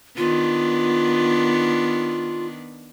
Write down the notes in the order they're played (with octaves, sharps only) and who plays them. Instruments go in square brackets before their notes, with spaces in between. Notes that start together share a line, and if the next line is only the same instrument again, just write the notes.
[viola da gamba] D#3 B3 D4 [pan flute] F4